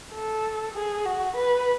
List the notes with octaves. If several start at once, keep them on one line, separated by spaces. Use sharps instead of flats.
A4
G#4
F#4
B4